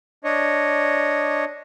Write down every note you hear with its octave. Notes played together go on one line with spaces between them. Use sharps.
D4 C#5 D#5